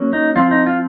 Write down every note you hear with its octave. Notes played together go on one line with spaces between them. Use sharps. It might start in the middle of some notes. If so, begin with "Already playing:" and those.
Already playing: F#3 A#3 C#4
D#4
F3 C4 F4
D#4
F4